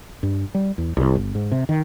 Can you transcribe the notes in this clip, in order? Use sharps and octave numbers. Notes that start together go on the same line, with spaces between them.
G2
G3
E2
C2
G1
G#2
C3
D#3